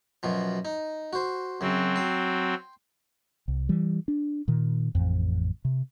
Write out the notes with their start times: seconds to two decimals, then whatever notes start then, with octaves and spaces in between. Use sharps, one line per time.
0.23 F#2 B2 F3
0.65 D#4
1.13 F#4 C5
1.61 F#2 C#3 F#3 C4
1.96 G5 C6
3.48 C2
3.69 E3 G3
4.08 D4
4.48 A#2 D#3
4.95 A1 F2
5.65 C3